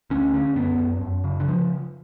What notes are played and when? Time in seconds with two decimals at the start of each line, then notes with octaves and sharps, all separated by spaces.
0.10 D2 C#4
0.34 D3 C#4
0.56 F#2 B3
0.79 F#2
1.01 F#2
1.24 C#3
1.40 D3
1.48 F3